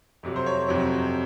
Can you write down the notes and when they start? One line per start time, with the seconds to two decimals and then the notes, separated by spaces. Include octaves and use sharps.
0.23 F2 C3 F#3
0.36 C5
0.46 C#5
0.68 F2 C3 F#3